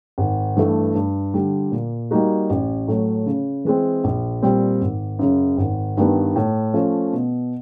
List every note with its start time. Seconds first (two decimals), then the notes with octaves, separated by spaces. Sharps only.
0.18 G#1
0.56 G2 E3 A3
0.95 G2
1.34 D3 G3
1.72 A#2
2.11 G3 A#3 D#4 F#4
2.50 A1
2.87 A2 F#3 A3
3.26 C#3
3.65 E3 G#3 C4
4.04 A#1
4.43 A#2 G3 C4
4.81 G#1
5.19 F#2 C#3
5.58 G#1
5.97 G2 D#3 G3 B3
6.36 A2
6.74 F3 A3 C#4
7.13 B2